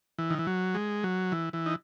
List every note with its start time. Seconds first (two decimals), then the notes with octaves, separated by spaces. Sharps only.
0.18 E3
0.30 D#3
0.39 E3
0.47 F#3
0.75 G#3
1.03 F#3
1.32 E3
1.53 E3
1.66 D#4